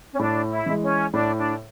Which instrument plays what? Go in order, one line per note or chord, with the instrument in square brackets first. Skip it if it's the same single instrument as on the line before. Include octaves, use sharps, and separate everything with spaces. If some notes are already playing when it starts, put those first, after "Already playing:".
[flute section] C#4
[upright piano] A2 [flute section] D4
[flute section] E4
[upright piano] E3 G#3
[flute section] C#4
[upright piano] A2 [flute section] D4
[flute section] D4